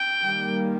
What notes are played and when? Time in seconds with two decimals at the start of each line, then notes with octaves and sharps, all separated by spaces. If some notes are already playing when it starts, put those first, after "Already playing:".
Already playing: G5
0.24 D#3 G3 A#3